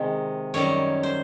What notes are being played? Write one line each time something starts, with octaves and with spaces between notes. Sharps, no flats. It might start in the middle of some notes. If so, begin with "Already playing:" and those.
Already playing: C3 D#3 G#3
F#2 D#3 G3 C#5
C5